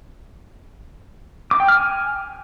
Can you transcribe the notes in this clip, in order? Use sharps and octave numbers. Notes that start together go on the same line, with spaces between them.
D6
G5
F6
G#5